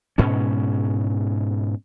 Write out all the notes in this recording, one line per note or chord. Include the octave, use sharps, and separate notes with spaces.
G#2 B2 C#4